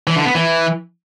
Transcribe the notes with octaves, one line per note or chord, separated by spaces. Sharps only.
E3
D3
B3
E3